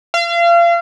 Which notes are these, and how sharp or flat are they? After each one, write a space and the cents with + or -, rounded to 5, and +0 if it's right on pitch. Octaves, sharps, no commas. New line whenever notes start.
F5 -35